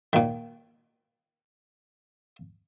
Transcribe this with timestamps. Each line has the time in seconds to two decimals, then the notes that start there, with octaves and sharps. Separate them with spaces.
0.13 A#2 D#3